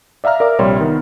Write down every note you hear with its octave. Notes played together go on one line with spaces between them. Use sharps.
D5 E5 F5 A#5 F6
A#4 D5 E5 F5 D6
A#1 C3 G3 C#5 E5 C6
D#3 B3